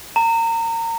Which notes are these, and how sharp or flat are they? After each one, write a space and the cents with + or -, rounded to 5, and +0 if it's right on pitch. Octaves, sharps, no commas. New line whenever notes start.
A#5 -30